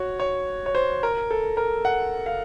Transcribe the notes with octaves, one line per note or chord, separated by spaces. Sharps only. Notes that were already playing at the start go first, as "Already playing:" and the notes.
Already playing: F#4 C#5
C#5
C#5
C5
A#4
A4
A#4
F#5
F5